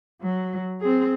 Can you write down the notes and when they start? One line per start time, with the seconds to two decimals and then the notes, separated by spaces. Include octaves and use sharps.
0.22 F#3
0.81 C4 G#4